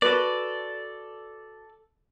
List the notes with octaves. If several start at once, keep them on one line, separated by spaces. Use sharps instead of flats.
F#4 A4 B4 D5